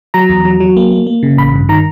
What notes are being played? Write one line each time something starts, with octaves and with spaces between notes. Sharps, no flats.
F#3 A#5
E2
F#3
F#3
A#3
A#3
A#3
C#3
A1 B5
G2
D#3 A#5